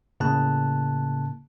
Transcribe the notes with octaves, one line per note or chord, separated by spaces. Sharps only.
A2 C#3 A#3 A5 F#6